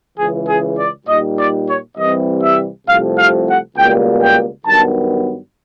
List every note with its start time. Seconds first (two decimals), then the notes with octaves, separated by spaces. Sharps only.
0.16 C#2 C#3 E3 G#4
0.46 G#4
0.76 D5
1.06 A#2 G3 A#3 D#4 D#5
1.36 D5
1.67 C#5
1.96 C2 C3 E3 G3 C4 D#5
2.41 E5
2.87 C2 C3 F3 A3 F5
3.16 F5
3.47 F#5
3.76 C#2 B2 G3 A#3 G5
4.21 G5
4.66 G2 D#3 F#3 B3 A5